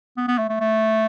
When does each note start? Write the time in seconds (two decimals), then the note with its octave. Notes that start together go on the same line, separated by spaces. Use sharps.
0.17 B3
0.28 B3
0.38 A3
0.49 A3
0.60 A3